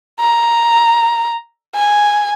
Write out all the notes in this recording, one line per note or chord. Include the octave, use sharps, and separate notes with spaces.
A#5
G#5